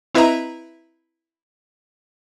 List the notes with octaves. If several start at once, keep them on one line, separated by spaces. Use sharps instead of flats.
C4 E4 B4 D#5 E5 A#5